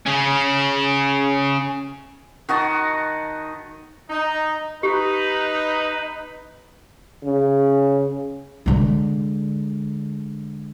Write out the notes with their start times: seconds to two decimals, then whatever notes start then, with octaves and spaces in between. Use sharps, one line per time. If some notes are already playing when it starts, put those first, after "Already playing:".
0.06 C#3 C#4
2.49 D#3 F#4 D#5 A5
4.10 D#4
4.83 D#4 G4 B4
7.23 C#3
8.66 D3 G#3